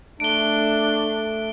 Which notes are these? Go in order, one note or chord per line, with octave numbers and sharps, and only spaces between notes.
A3 D4 D7 G7